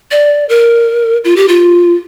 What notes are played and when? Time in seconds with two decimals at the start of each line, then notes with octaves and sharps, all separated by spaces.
0.11 D5
0.49 A#4
1.25 F4
1.36 G4
1.48 F4